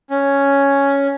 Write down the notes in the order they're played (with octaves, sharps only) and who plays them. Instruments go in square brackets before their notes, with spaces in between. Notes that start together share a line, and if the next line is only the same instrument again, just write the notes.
[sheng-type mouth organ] C#4